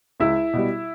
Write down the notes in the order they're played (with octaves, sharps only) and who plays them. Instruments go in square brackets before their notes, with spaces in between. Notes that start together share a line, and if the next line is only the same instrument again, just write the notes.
[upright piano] C#2 E4 E5
B2 G3